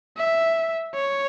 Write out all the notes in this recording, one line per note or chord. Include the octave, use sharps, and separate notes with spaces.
E5
C#5